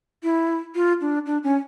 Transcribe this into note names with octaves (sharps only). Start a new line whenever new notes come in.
E4
F4
D4
D4
C#4